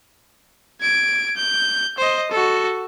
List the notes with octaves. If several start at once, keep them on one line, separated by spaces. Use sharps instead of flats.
G#6 D7
G6
C5 D#5
F#4 A4